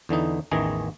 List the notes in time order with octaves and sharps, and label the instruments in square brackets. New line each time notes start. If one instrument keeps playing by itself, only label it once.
[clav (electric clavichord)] E2 D3 E3 D#4
A1 E2 D#3 E3 G#4 A#5